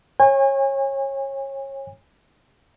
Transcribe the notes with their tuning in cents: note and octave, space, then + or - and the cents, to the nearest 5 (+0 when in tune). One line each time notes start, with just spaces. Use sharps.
C#5 -25 G#5 -35